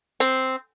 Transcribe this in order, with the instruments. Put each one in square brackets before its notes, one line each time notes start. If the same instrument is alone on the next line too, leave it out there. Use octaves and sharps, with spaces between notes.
[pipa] C4